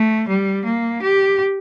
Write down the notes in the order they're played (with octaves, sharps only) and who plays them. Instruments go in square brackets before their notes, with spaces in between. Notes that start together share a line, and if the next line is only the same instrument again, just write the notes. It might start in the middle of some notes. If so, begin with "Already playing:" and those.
Already playing: [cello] A3
G3
A#3
G4